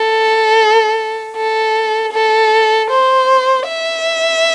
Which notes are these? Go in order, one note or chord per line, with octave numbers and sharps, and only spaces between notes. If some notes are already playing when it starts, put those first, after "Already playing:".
Already playing: A4
A4
A4
C5
E5